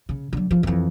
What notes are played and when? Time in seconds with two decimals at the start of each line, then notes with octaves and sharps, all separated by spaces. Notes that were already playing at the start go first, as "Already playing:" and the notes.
0.09 C#3
0.33 D3 F#3
0.51 F3
0.63 F2 E3